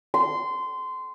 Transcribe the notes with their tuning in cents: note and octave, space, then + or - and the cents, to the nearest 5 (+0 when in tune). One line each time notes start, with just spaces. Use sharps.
C6 -20